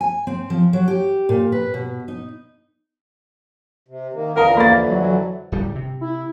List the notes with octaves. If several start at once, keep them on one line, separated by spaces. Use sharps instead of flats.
G#5
C4
F3
F#3
G4
A#2
B4
B2
D#4
C3
D#3 A#3
F2 D3 E3 A#4 F5 A#5 D#6
A#3 B5 A6
F#3
F#3
D1 G3
C3
E4